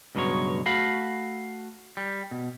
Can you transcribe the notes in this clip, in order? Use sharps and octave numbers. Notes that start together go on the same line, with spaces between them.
C#2 G2 B2 F#3 G#3 C#5
A3 F#4 F5 B5
G3
B2